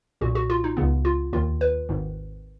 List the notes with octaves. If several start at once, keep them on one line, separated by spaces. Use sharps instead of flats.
B1 A#2 F#4
F#4
F4
D#4
C#2 C#3 B3
F4
D#2 D#3 F4
B4
G#1 G#2 D#3